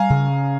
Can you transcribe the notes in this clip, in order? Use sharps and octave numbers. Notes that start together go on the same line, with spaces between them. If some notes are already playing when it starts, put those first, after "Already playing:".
Already playing: G3 F5 G#5 A#5
C#3